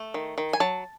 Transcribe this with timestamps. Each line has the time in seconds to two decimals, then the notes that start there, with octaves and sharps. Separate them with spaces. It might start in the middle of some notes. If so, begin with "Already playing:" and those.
Already playing: A3
0.14 D#3
0.38 D#3
0.53 G#5
0.60 F#3 A5